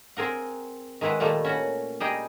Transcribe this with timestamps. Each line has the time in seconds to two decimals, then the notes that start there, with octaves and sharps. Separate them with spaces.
0.17 C4 G#4 A#4 F#5
1.01 D#3 G#3 E4 B4 F#5
1.20 A#2 D#3 G3 A3
1.45 C#4 F#4 F#5
2.00 G3 D#4 G#4 D#5 G5